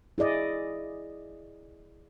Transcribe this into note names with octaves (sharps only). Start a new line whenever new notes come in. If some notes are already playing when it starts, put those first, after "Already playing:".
E4 G#4 D5 D#5